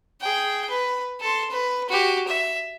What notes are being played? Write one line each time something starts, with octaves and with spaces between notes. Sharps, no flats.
G#4 G5
B4
A4 C6
B4
F#4 G4
E5